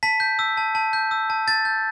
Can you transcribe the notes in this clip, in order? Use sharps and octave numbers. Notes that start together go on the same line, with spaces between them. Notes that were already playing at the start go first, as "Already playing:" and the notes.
A5 B6
G6
E6
A5
A5
G6
E6
A5
A5 A6
G6